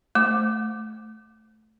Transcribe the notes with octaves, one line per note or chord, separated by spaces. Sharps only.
A3 D6